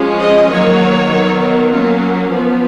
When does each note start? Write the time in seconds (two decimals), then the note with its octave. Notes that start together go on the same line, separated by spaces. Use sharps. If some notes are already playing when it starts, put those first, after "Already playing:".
Already playing: F3 G#3 C#4
0.20 D#5
0.49 D#3 F#3 A#3 C#5
1.09 D#3 F#3 B3
1.39 A#4
1.69 F#3 A#3 C#4 F4
2.29 F3 B3